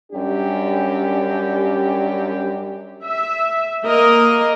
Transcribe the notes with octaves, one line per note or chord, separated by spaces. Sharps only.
F#2 G3 C#4 D4 G4
E5
A#3 A#4 D#5